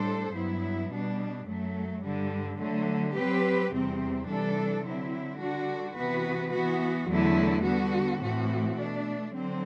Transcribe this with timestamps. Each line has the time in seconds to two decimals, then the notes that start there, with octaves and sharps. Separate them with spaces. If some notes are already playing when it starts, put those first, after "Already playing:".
Already playing: A2 G3 D4 A4 C5
0.33 G2 F#3 B3 E4
0.90 B2 G3 D4
1.46 F#2 F#3 A3
2.02 G2 D3 G3
2.58 D3 F#3 A3
3.14 F#3 C4 G4 B4
3.70 E2 C3 G3 C4
4.27 C3 E3 G3 D4 A4
4.83 D3 F#3 C4 E4
5.39 D3 G3 D4 F#4
5.95 C3 E3 B3 F#4 B4
6.52 E3 B3 F#4
7.08 E2 D3 F#3 A3 E4
7.63 D3 G3 B3 F#4
8.20 A2 E3 A3 C4 F#4
8.76 B2 A3 D4
9.33 D3 F#3 C4